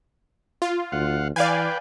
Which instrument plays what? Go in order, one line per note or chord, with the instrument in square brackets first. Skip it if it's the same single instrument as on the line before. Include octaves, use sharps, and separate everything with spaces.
[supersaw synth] F4
[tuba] D2 [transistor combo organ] F5 F#5
[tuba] E3 [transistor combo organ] B4 G5 [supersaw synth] D5 F5 G#5